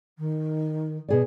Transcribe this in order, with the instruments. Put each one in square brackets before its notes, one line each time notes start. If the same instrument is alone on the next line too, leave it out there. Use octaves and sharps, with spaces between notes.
[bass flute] D#3
[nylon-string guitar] B2 G#4 D5